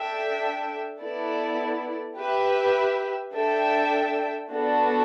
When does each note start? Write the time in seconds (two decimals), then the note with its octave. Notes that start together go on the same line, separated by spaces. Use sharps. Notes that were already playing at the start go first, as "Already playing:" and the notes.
Already playing: D4 A4 E5 G5
1.00 B3 E4 A4 D5
2.16 G4 B4 E5
3.34 D4 A4 E5 G5
4.51 B3 D4 F#4 A4